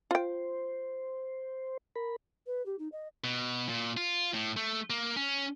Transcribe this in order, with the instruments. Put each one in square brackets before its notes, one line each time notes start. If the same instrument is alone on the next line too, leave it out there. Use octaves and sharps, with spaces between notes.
[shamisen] F4 G5 [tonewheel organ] C5
[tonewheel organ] A#4 B5
[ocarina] B4
G4
D#4
D#5
[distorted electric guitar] B2
A#2
F4
A2
A3
A#3
C#4